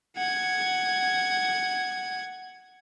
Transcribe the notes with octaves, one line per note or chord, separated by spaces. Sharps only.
F#5 G#6